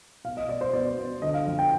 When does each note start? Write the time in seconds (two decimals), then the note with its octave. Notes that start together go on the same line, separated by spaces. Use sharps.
0.24 B2 F5
0.37 D#5
0.49 B2 D5
0.61 C5
0.73 B3 D5
0.98 B3
1.22 D3 D#5
1.34 F5
1.47 F2
1.59 G5